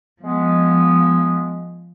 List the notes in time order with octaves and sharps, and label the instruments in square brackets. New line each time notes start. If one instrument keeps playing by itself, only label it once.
[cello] F3 [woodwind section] G#3 B3